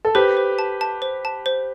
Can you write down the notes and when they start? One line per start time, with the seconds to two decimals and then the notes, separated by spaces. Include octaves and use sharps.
0.05 A4
0.15 G4 B4 C5
0.37 C5
0.59 A5
0.81 A5
1.02 C5
1.25 A5
1.46 C5